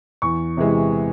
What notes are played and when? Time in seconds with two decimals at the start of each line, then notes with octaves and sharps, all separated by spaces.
0.22 E2 C#6
0.57 C3 E3 G#3